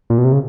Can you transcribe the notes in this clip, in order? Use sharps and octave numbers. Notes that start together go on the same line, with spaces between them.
A#2
B2
C3
C#3